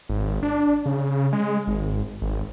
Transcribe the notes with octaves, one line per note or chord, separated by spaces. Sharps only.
G#1
D4
C#3
G#3
G#1
G#1